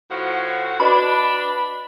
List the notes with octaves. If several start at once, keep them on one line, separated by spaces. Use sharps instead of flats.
A2 F3 F#4
D4 F#4 B4 D#5 B5